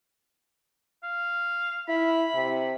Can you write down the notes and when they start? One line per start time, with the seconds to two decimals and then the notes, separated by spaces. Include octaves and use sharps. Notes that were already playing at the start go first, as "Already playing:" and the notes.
1.03 F5
1.89 E4 B5
2.35 C3